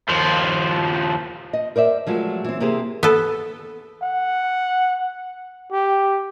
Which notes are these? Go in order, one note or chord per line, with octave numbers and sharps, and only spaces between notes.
D#2 F3
D#5
A#4 C5 D5 E5
F3 F#3 G#3 A3
E3 C4
C3 A#3 E4 G4 G#4 C5
B3 A4
F#5
G4